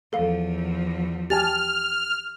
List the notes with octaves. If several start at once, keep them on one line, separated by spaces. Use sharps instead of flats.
E2 F3 A4 F5
G4 G#5 A5 F6 A6